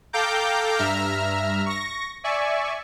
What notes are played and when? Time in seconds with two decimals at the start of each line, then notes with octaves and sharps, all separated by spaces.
0.13 A4 F5 G5 A#5 D6 G6
0.79 G2 E5 A#5 F6
1.66 C#6 A#6
2.24 D5 E5 G#5 C#6